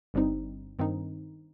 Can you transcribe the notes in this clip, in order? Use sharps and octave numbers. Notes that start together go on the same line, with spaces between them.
G1 G2 G3 C4 D#4
G2 D#3 C4 D#4